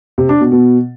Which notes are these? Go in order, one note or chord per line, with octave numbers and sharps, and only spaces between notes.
C3
D4
B2
B2